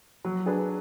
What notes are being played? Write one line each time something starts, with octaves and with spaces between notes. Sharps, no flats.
F#3
D4 G#4 B4